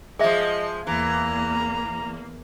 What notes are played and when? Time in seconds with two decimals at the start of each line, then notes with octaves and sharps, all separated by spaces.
0.19 F3 G#3 G#4 D#5 E5
0.87 E2 E3 A#3 A#5